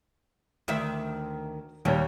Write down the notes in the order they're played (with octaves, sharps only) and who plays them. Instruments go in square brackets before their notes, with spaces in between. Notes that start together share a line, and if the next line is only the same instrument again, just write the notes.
[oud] D2 D#3 E5
[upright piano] D#2 C#5 [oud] A#2 G3